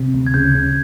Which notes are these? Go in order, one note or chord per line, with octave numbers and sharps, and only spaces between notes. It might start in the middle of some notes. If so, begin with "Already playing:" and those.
Already playing: C3
D2
G#6
C#3 G6
C#3